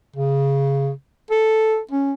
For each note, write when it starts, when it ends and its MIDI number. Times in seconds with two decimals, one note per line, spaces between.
0.16 0.90 49
1.31 1.80 69
1.91 2.12 61